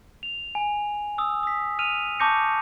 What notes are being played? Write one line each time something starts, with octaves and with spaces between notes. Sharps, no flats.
F7
G#5
D#6 E6
D#6 B6
F6 D#7 F7
A5 C#6 D6 G6 A#6 C#7